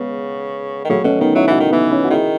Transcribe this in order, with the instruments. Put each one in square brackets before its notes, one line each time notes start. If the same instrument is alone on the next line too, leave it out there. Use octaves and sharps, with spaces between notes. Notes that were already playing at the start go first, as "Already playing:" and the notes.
Already playing: [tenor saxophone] C#3 [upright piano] G#3 B3
[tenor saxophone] D#3
[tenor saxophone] C#3 [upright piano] F#3 A3
[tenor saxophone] B2 [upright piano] A3 C#4
[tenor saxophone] D#3 [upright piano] B3 D#4
[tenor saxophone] F#3 [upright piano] C#4 E4
[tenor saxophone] E3 [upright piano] D#4 F#4
[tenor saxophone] D#3
[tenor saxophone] E3 [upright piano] B3 D#4
[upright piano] C#4 E4
F#4
[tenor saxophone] D#3 [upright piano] E4 G#4